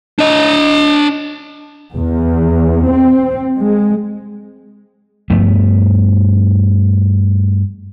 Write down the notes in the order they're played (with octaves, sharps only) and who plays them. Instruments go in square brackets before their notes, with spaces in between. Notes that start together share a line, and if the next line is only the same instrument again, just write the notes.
[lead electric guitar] D4 D#5
[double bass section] E2
C4
G#3
[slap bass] G2 F3 A3 B3